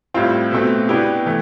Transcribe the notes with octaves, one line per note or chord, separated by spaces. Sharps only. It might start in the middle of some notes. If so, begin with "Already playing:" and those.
A2 G3 C4 F4
B2 A3 C4
B2 B3 D4 E4 G4
E3 A3